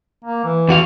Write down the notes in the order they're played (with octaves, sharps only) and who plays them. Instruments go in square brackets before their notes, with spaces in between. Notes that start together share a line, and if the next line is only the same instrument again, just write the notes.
[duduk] A#3
E3
[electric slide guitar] E2 F#4 F5